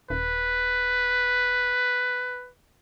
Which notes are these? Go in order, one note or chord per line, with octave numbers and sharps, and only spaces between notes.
D#1 B4